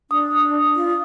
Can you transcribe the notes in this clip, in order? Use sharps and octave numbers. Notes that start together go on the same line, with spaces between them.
D4 D#6
F4